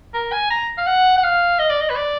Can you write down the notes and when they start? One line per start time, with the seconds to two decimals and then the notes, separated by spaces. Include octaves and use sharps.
0.14 A#4
0.32 G#5
0.51 A#5
0.78 F5
0.87 F#5
1.17 F#5
1.23 F5
1.59 D#5
1.70 D5
1.81 D#5
1.90 B4
1.96 D5